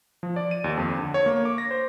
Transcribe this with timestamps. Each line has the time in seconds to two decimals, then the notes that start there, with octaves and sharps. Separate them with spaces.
0.23 F3
0.36 D5
0.51 D#7
0.64 D#2
0.77 F2
0.99 D3
1.14 C#5
1.26 A#3
1.45 D6
1.58 A#6
1.71 C5